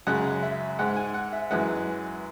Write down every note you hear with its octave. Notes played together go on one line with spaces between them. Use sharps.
F#2 C#3 G#3 F#5
E5
G#2 G#3 F#5
G#5
F#5
E5
F#2 E3 G#3 F#5